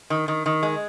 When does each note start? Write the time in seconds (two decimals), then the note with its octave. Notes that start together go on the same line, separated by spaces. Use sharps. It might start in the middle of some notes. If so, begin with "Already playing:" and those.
0.10 D#3
0.28 D#3
0.46 D#3
0.63 G#3